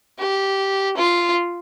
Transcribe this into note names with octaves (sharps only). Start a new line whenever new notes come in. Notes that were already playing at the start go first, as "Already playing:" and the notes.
G4
F4